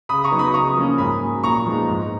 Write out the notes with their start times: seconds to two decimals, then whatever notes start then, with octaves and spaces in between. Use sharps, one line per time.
0.09 C#3 B5 D#6
0.24 A#5 C#6
0.31 F#3 B3 D#4
0.39 B5 D#6
0.54 C#3 A#5 C#6
0.76 F3 A#3 C#4
0.98 G#2 G#5 B5
1.20 F#3 A#3
1.43 A#2 A#5 C#6
1.65 F3 G#3 B3 D#4
1.89 G#2